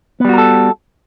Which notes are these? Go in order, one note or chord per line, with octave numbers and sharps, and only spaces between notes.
G3 B3 F#4 A4 A#4